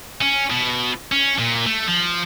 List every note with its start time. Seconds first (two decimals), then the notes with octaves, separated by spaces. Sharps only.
0.21 C#4
0.50 B2
1.12 C#4
1.39 A#2
1.66 A3
1.88 F3